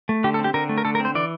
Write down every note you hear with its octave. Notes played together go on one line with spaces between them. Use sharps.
A3
D3 G4
A4
C4
G4
D3 A#4
A3
A#4
D3 A4
A#4
C4 C5
E3 D5